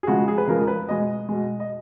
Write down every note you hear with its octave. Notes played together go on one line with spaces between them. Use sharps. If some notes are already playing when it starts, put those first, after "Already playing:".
G#4
C#3 F3 G#3 F#4
G#4
B4
C#3 F3 G#3 A#4
B4
B2 G#3 D#5
B2 G#3
D#5